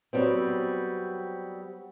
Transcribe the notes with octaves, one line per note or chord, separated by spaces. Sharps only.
F#3 G3 B3 C4